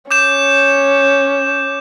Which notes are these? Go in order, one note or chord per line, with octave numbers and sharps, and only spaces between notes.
C#4 D6 G6 E7